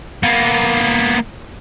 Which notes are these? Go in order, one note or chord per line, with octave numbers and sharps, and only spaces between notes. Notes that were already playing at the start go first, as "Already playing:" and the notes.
A#3 B3